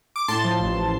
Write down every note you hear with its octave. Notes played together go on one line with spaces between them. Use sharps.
D6
A2 A5 C6
F3
A1